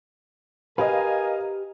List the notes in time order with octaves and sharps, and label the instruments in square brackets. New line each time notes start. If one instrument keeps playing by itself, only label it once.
[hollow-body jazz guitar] G4 B4 [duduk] A#4 [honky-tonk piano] D#5 F5 [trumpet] G#5